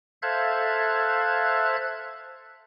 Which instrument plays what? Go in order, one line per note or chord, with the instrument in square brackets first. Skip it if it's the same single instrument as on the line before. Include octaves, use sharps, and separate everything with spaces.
[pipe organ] A4 C5 E5 F5 F#6 G#6